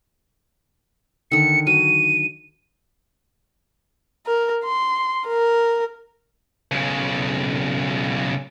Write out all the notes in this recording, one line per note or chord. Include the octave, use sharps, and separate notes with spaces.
D3 D#3 C#7
F#3 D#7
A#4
C6
A#4
B1 C#3